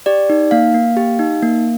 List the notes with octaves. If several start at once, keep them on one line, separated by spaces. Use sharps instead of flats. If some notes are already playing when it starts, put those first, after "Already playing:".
G4 D5
D#4
A#3 F5
A#3
G4
D#4
A#3